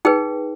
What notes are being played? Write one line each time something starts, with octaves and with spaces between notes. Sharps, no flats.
D#4 G#4 B4 G5